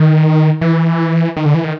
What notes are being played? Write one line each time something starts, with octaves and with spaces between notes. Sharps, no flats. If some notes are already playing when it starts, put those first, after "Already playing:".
Already playing: D#3
E3
D#3
D3
E3
D#3